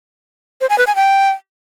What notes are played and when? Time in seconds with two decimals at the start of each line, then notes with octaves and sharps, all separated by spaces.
0.61 C5
0.70 G#5
0.78 B4
0.87 G#5
0.96 G5